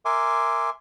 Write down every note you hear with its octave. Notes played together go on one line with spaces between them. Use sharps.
A#4 E5 G#5 C6 D6